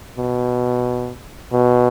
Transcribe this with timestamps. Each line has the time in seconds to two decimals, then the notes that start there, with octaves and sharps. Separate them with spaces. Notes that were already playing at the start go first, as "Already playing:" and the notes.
0.18 B2
1.53 B2